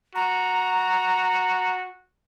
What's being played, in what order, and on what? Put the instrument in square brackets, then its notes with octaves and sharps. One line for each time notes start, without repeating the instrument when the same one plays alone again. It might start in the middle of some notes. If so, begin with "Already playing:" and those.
[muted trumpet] F#4 [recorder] A#5